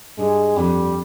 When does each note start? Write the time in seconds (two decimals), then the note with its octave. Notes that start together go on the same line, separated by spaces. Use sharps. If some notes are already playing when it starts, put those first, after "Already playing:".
0.18 G2 G#3
0.56 F2 G3